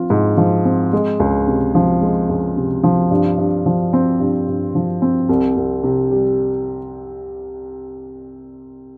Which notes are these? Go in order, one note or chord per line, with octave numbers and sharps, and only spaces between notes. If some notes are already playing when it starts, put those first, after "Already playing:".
Already playing: F3 C4 F4
G#2
F3
C4
G#3
C#2
C3
F3
G#3
C#2
C3
F3
G2
G2
F3
C4
G2
G2
F3
C4
C2
C2
C3
G3